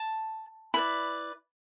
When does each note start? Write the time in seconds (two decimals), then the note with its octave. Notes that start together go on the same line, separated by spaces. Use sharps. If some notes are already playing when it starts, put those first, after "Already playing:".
Already playing: A5
0.74 E4 B4 D5 B5